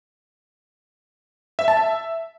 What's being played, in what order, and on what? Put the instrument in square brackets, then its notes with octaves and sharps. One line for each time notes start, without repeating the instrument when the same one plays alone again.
[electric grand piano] E5
A5
E5